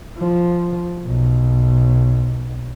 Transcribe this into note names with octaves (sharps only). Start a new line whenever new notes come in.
F3
B1